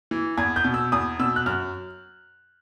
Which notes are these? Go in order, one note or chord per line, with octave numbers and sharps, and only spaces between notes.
E3
E2 G#6
G6
B2
E6
E2 D#6
B2 E6
F#6
F#2 F6